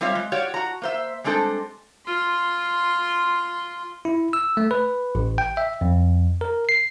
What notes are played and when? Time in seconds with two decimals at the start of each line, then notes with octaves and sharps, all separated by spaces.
0.01 G3 C4 F4 C#5 E5 F5
0.15 G#3
0.32 F#4 G4 C#5 D5 F5
0.54 F#4 A#5
0.82 A#3 C5 E5
1.24 G3 G#3 C4 D4 A4 C5
2.06 F4 C6
4.05 E4
4.33 E6
4.57 A3
4.71 B4
5.15 A1
5.38 G5
5.57 E5
5.81 F2
6.41 A#4
6.69 C7